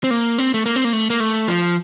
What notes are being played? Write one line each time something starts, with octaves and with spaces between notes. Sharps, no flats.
C4
A#3
C4
A3
A#3
C4
A#3
A3
A#3
A3
F3